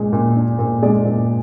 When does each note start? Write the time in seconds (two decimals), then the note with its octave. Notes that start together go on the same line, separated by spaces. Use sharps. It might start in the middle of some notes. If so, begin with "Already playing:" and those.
Already playing: A#2 G#3
0.13 A#2
0.36 D4
0.59 A#2
0.82 G#3 D5
1.05 A#2